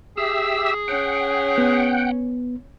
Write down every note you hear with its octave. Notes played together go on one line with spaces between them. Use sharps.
G4 G#4 E5 E6
C#4 F#5 G5
B3